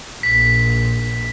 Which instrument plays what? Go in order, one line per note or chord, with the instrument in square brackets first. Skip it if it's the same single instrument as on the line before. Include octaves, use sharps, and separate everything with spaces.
[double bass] A#1 [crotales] B6